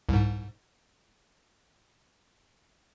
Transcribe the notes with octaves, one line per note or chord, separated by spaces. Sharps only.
C2 G#2